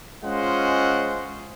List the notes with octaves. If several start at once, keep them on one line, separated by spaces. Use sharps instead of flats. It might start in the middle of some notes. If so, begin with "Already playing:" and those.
G#3 C#4 F4 C5 D#5 F#5